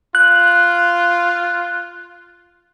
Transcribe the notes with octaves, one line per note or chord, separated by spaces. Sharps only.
F4 F#6